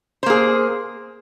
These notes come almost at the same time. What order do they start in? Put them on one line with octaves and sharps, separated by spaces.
C5 A#3 G#4